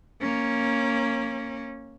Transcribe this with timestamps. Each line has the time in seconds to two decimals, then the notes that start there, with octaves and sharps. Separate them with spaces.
0.21 A#3 C#4